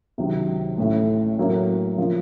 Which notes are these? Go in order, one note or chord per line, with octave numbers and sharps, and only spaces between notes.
C#2 C3 D#3 F#3 C4
A1 A2 A3
A2 F#3 A#3 C#4
C#3 F3 A#3